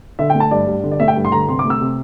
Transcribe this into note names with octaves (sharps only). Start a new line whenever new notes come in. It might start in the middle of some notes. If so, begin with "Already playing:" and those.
D3 E5
G5
A3
A5
G2 D5
G2
D3
D5
A3 E5
G5
G2
C6
D3 A#5
C3 C6
D6
A3
E6
C3